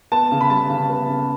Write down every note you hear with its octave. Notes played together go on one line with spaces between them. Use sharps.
B3 A5
C#3
B5
G3 A5
C#3
B3
C#3